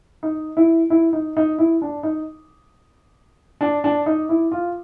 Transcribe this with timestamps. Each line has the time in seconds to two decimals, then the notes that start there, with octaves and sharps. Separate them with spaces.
0.23 D#4
0.57 E4
0.90 E4
1.13 D#4
1.37 D#4
1.59 E4
1.82 D4
2.03 D#4
3.61 D4
3.84 D4
4.06 D#4
4.29 E4
4.52 F4